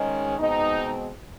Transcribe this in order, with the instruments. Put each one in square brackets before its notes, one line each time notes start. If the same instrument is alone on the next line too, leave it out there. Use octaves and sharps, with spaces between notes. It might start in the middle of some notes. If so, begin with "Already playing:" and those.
Already playing: [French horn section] G#2 D#3 G#3 C#4
B2 G#3 C4 D#4